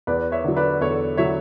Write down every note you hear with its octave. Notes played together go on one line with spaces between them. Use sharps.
E2 B4 D5
C#5 E5
D3 F#3
B4 D5
E2 A4 C#5
D3 F#3 C#5 E5